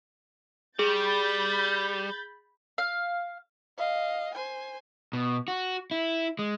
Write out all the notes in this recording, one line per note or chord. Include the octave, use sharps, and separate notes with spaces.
G3 G#4 B5 G6 A6
F5
D#5 F5
C5 G#5
B2
F#4
E4
G#3